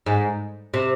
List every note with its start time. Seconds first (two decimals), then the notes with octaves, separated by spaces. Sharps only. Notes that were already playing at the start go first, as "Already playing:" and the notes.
0.06 G#2
0.74 C3